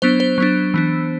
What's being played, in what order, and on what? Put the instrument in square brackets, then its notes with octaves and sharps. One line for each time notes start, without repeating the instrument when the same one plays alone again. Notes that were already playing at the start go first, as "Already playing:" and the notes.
[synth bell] F#3 B3 D4 C5
C5
F#3 B3 D4
E3 B3 D4